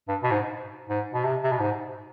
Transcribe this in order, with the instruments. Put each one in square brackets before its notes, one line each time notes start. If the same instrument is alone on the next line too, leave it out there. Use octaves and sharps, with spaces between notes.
[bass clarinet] G2
B2
G#2
G#2
B2
C3
C3
B2
G#2